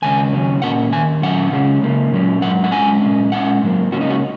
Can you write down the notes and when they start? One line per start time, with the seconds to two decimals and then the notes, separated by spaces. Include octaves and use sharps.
0.02 D#2 C#3 G#3 C#4 G#5
0.32 D#2 C#3 F#3 C#4
0.62 A#2 A#3 C#4 F#5
0.92 D#2 D#3 G#5
1.22 A#2 F#3 C#4 F#5
1.52 C#2 C#3 G#3 C#4
1.82 C#2 C#3 A#3 C#4
2.12 A#2 F#3 C#4
2.42 G#2 D#3 F#3 F#5
2.64 F#5
2.71 G#2 G#3 C#4 G#5
3.01 A#2 G#3 C#4
3.32 A#2 G#3 C#4 F#5
3.62 G#2 F#3 A#3
3.92 C#2 C#3 A#3 C#4 F#4
4.01 D#4
4.10 F#4